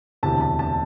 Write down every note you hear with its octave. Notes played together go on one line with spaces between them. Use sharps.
E1 D2 C3 E3 A5
A5
A5